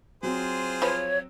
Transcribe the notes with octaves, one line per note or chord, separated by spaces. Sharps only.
F#3 C4 F4 G#4 C5
F3 B4 C#5